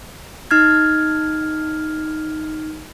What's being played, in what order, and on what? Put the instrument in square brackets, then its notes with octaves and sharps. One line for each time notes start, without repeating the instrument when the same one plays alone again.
[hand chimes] D#4 F6 G#6